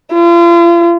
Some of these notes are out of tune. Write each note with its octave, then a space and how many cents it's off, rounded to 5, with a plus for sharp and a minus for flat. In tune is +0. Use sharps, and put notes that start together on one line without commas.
F4 -40